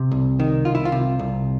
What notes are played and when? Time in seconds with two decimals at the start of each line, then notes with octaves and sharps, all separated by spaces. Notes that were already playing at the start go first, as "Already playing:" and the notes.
Already playing: C3
0.11 C2
0.40 D#3
0.65 C2 F4
0.75 E4
0.85 F4
0.92 C3
1.19 C2